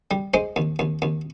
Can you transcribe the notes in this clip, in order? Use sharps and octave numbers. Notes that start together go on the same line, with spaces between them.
G3
G#3 C5
D#2
D#2
D#2